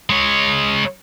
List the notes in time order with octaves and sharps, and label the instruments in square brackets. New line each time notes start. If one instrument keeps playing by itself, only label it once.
[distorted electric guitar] G#3 C#5